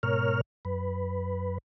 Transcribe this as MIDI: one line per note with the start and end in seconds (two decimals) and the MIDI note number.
0.03 0.41 44
0.03 0.41 47
0.03 0.41 70
0.03 0.41 73
0.03 0.41 89
0.65 1.58 42
0.65 1.58 71